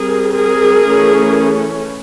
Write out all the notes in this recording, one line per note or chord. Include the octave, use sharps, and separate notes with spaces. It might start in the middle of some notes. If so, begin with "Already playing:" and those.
Already playing: G3 C4 G#4 A#4
G#4 A#4
E3 A3 C#4